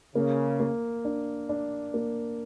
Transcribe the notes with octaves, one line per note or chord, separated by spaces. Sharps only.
C#3 A#3
A#3
D4
D4
A#3